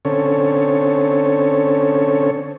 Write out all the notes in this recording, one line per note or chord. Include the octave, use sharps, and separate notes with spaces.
D3 C4 C#4 A4 C#5